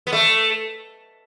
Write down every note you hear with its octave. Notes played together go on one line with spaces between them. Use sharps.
B3
A3